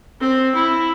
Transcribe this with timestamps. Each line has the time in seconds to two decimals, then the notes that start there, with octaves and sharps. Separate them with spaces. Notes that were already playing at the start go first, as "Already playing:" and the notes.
0.21 C4
0.55 E4